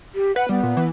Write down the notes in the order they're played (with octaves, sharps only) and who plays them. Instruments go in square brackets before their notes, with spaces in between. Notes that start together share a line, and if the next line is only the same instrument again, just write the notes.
[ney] G4
[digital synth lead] B4 [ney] F#5
[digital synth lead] G3 [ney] B3
[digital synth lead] A#2
E3